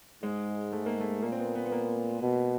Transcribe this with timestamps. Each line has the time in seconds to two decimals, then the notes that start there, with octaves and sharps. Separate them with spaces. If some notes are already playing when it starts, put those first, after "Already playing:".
0.23 G#2 G#3
0.72 A3
0.86 A#3
1.00 A3
1.22 A#2 A#3
1.32 C4
1.39 B3
1.55 B3
1.66 B3
1.72 A#3
2.22 B2